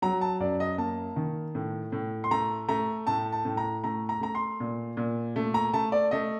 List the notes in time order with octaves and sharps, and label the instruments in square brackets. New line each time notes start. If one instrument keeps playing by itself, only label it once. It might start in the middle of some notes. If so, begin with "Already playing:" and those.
[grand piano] F#3 A#5
A5
F#2 D5
D#5
A#3 A5
D#3
A2
A2
C6
A3 A#5
A3 A#5
A2 A5
A5
A2
A#5
A3 A#5
A#5
A3 A#5
C6
A#2
A#2
A3
A#5
A3 A5
D5
A3 D#5